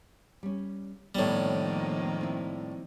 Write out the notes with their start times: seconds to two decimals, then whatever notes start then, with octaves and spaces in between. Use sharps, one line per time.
0.43 G3 C#4
1.15 F2 A2 D#3 G3 A#3 B3 G4 C#5
2.21 C4 E4